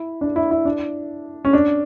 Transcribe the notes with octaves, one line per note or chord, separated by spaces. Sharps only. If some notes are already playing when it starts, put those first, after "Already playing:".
Already playing: E4
D4
E4
E4
D4
C#4
D4